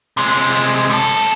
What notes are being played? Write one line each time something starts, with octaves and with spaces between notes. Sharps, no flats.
C3 G#3
F#2 A4